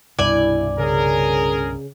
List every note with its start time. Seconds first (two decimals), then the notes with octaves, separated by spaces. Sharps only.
0.19 C2 G2 B2 E4 D5 G#5
0.79 C#3 C#4 G#4 A#4